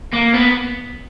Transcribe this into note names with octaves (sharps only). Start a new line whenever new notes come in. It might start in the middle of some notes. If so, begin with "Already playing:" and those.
A#3
B3